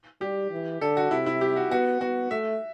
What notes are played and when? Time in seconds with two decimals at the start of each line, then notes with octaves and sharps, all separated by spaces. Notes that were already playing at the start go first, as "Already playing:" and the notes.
0.21 G3 G4
0.51 E3
0.81 D3 A4
0.97 F#4
1.11 C3 E4
1.26 E4
1.41 G4
1.56 F#4
1.71 B3 F#4
2.01 B3 F#4
2.31 A3 E5